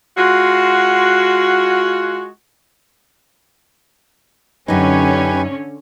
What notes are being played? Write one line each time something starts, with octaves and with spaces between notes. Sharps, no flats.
G#3 F4 F#4
F#2 D3 C#4 D#4 G4 B4 G#5